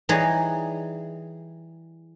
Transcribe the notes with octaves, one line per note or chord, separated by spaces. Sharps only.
E3 G3 D#4 G#4 C#5